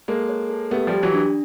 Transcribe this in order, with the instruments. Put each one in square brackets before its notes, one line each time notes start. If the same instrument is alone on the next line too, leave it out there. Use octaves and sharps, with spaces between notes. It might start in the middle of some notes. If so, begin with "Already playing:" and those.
[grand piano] G#3 A#3 [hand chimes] A4
[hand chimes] C#5
A4
[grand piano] A3 B3 [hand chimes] G4
[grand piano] F3 G3
[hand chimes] G4
[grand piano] E3 F#3
[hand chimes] D4